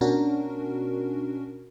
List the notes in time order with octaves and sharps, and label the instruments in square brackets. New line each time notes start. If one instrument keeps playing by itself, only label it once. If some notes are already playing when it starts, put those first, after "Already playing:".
[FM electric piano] B2 C#4 D4 F#4 A#4